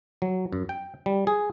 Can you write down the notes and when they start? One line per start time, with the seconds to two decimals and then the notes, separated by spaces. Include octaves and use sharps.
0.22 F#3
0.52 F#2
0.69 G5
1.06 G3
1.27 G#4